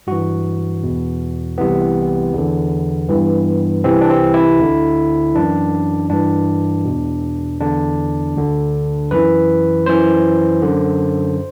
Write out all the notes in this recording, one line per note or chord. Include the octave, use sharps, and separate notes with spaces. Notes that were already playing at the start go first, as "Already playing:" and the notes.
G2 E3 F#4
E2 B2
C2 C3 E3 B3
E2 D3
G2 E3
C2 C3 E3 C4
D4
C4
E4
D2 D3
F#2 E3 D4
G2 E3 D4
E2 B2
E2 D3 D4
D2 D3
F#2 E3 B4
F#2 E3 C5
F#2 D3